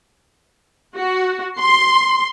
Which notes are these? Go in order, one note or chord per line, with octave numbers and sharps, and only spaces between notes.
F#4
C6